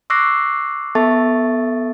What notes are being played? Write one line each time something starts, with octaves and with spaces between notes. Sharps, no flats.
C#6 D6 E6 F#6 A#6 C7
B3 A4 E5 A5 C#6 A6